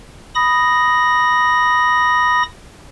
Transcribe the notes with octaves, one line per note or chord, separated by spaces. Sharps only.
B5 D#6 A#6